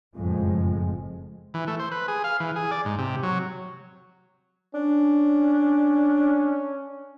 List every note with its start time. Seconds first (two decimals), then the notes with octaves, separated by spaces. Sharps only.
0.17 F#1 F2 A2 F3 G#3
1.54 E3
1.67 A3
1.79 C5
1.92 B4
2.08 G#4
2.24 F5
2.40 E3
2.56 G#4
2.71 D5
2.85 G#2
2.98 C3
3.23 F#3
4.75 C#4 D4